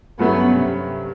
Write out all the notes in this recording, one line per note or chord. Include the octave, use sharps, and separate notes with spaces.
G2 F#3 A3 B3 C#4
C3